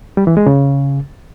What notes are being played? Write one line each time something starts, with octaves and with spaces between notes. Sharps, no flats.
G3
E3
G#3
C#3